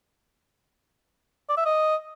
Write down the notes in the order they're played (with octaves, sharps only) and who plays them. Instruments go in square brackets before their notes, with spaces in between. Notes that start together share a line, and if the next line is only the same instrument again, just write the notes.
[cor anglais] D5
E5
D#5